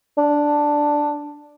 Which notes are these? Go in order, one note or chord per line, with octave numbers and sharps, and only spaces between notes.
D4